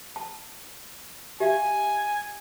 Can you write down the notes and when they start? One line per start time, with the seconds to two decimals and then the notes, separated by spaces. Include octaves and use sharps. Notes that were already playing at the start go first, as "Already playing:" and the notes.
0.16 A5
1.40 G4 E5 F5 G#5